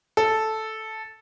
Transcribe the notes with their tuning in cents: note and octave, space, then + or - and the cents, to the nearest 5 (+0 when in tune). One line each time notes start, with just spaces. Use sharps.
A4 -5